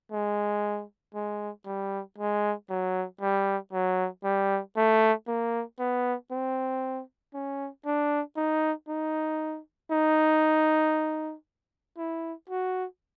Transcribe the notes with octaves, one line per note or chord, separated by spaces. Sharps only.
G#3
G#3
G3
G#3
F#3
G3
F#3
G3
A3
A#3
B3
C4
C#4
D4
D#4
D#4
D#4
E4
F#4